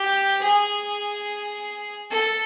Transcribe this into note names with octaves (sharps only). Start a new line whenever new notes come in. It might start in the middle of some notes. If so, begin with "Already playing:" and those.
Already playing: G4
G#4
A4